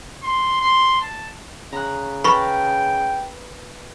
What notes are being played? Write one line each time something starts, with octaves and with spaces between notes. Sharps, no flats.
C6
C6
A5
C#3 A#5 F#6
A#4 B4 G5 A5 B5 C#6